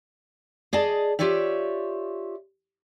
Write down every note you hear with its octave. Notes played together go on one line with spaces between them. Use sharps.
G#4 D5 D#5 A5
F4 G4 C#5 D5 E5